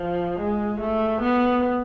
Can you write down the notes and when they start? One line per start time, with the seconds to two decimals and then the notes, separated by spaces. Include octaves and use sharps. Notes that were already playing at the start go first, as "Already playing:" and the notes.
Already playing: F3
0.40 G#3
0.81 A3
1.22 B3